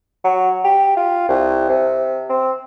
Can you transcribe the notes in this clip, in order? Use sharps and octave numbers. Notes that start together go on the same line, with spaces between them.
F#3
G4
F4
C2
C3
C4